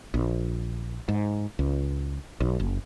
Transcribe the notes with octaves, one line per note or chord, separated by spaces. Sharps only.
A#1
G#2
C#2
B1
F#1